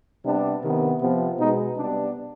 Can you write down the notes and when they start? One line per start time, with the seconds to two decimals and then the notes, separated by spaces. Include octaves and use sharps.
0.25 C3 G3 B3 D4
0.63 C3 D#3 B3
1.01 C3 F3 B3
1.39 B2 G#3 B3 D#4
1.77 C3 G3 B3 D4